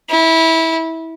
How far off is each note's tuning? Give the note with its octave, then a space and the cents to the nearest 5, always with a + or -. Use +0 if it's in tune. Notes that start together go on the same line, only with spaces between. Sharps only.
E4 -20